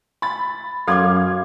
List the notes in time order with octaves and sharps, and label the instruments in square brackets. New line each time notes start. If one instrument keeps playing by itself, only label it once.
[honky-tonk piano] B5 A6
[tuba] F#2 [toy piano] A4 C6 D6 [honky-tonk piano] F5 G#6